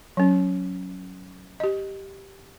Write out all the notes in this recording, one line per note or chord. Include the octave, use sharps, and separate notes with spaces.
F#3 C#4
G4 D#5